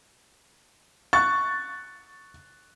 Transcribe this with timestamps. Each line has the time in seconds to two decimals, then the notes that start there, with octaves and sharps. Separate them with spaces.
1.13 C#6 F#6 A6